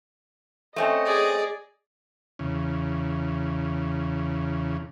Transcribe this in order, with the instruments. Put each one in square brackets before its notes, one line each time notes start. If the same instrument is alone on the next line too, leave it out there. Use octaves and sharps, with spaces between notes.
[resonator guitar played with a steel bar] A3 C4 C#4 [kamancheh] D#5
[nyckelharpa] G#4 D5
[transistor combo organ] E2 C#3